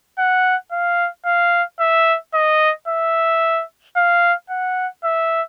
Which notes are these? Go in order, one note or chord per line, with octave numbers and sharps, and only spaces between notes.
F#5
F5
F5
E5
D#5
E5
F5
F#5
E5